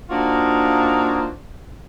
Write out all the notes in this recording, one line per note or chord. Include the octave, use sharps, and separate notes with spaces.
A#3 D4 D#4 F4 F#4 C5